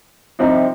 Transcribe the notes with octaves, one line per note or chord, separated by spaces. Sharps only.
C2 C3 F3 C4 D#4